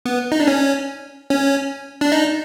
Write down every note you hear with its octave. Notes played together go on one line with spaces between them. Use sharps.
B3
D#4
D4
C#4
C#4
D4
D#4